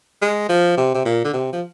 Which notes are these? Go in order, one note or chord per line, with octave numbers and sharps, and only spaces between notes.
G#3
F3
C3
C3
A#2
D3
C3
F3